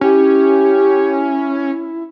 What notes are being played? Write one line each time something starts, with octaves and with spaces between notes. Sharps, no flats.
C#4 E4 G4